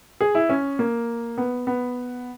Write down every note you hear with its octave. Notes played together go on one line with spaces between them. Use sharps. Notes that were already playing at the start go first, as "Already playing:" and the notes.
G#4
E4
C#4
A#3
B3
B3